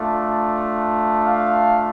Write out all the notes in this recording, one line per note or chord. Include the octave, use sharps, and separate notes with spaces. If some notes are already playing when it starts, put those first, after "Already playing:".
Already playing: A3 D4 F4
F5